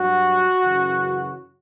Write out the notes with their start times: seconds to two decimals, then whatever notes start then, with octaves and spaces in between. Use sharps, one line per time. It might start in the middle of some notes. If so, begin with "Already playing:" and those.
Already playing: G2 F#3 F#4
0.63 F#2 C#3 E3